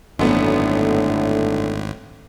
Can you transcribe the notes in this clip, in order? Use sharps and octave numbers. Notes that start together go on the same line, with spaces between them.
G#1 F#2 A2 D3 A3 B3